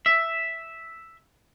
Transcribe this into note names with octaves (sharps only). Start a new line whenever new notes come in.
E5